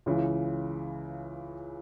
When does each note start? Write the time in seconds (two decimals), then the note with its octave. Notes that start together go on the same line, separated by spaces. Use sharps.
0.06 C#2 C#3 E3